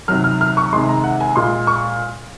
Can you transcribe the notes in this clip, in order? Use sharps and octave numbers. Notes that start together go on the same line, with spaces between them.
C3 D#3 F#3 F6
F6
F6
C#6
C3 D#3 G#3 C6
A#5
F#5
G#5
A#2 G#3 C6
C#6